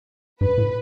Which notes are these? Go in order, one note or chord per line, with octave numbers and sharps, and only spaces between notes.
G2 B4
A2